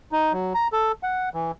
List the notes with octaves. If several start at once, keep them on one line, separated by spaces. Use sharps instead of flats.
D#4
F#3
A#5
A4
F#5
E3